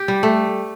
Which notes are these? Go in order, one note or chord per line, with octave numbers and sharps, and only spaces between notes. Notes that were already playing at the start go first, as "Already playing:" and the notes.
Already playing: G4
G3
A3